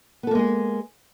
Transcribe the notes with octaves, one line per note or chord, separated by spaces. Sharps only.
G#3 A#3 B3 G#4 A4